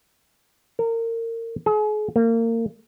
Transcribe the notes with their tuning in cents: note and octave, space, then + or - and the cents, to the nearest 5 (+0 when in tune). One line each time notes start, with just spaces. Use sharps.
A#4 -30
G#4 +40
A#3 -30